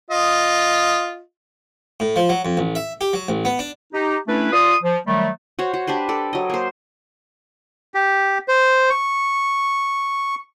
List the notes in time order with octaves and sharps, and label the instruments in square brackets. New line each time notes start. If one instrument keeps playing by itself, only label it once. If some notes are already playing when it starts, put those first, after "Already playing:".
[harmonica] F4 D#5
[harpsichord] A2
F3
F#3
F2
A1
E5
G4
F#3
A1
B3
D4
[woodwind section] D#4 G4
A3 C#4 D4 E4 B4
F4 D5 C6 D#6
F3
D#3 F#3 G3 A3
[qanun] F#4 C5 C#5
F#4
D4 G4 B4 C5
A4 D5
F#3 D#5
A#3 C5
[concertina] G4
C5
C#6